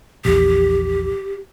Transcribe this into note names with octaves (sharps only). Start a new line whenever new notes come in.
A#1 E2 G4